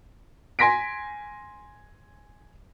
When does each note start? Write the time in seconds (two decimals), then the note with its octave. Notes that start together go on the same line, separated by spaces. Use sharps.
0.59 G#5 C6 A#6 B6 D7